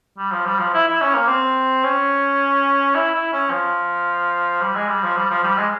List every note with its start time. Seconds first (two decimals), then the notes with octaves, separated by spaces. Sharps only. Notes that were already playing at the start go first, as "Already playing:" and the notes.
0.18 G3
0.32 F3
0.46 G3
0.59 F3
0.74 E4
0.88 E4
1.01 C#4
1.15 A#3
1.28 C4
1.85 C#4
2.95 E4
3.14 E4
3.32 C#4
3.50 F3
4.61 G3
4.75 G#3
4.89 G3
5.03 F3
5.17 G3
5.31 F3
5.44 G3
5.57 G#3